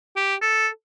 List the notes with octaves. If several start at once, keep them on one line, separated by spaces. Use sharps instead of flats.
G4
A4